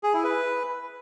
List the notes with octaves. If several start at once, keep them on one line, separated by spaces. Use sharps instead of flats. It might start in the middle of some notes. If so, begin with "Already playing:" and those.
G#4
E4
B4